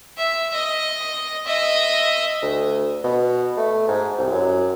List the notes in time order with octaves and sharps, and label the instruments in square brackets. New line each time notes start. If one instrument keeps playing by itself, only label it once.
[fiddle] E5
D#5
D#5 E5
[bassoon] D2
B2
A3
G#2
C2
F#2